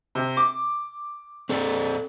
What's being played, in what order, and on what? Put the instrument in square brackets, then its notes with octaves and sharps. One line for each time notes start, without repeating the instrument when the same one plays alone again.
[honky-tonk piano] C3
D6
[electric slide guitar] C4 A4 D5